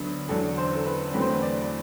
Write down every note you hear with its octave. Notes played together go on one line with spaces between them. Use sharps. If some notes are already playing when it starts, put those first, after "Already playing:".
Already playing: D2 D3 F#3 B3
E2 D3 F#3 A4
C5
A4
B4
E2 D3 F#3 A3 C4 B4
C5
B4
D5